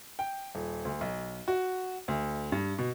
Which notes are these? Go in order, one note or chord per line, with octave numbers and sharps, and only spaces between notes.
G5
D#1
D2
B1
F#4
D2
G2
B2